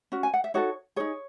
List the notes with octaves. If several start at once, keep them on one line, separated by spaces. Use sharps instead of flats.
C#4 F#4
G#5
F#5
E5
D#4 F#4 A4 C#5
D#4 G#4 C#5